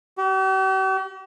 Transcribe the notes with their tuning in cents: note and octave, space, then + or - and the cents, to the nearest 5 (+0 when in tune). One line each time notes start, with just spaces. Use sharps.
G4 -45